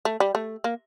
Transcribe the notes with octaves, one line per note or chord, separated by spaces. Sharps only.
A3
G3
A3
A#3